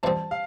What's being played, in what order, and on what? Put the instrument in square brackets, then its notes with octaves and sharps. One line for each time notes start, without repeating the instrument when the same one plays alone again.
[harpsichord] F2 E3 G3 C4 [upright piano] A5
[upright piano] F5